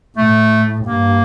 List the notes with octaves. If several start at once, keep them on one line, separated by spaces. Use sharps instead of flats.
A2 A3
G2 A#3